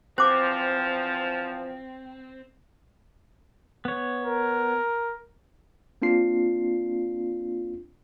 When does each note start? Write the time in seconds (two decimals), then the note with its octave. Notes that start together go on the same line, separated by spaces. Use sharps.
0.18 E2 F3 C4 C5 D6
3.85 B3 C#5
4.23 A#4
6.02 A#3 C4 D4 F4 C7